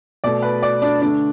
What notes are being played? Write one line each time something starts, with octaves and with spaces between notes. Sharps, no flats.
B2 A3 D5
B4
D5
D4
D3 A3 D4